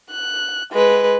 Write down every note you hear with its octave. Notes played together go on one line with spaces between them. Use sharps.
F#6
G#3 B4